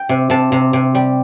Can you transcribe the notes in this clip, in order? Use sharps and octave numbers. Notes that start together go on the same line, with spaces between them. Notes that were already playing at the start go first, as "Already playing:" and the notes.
Already playing: G5
C3
C3 A5
C3
C3
G3